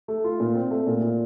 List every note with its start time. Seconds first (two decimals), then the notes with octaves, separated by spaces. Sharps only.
0.08 A3
0.24 F4
0.40 A#2
0.55 C4
0.71 A3
0.87 A#2
1.02 A#2